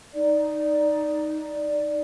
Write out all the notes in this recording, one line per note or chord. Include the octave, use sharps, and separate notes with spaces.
D#4 D5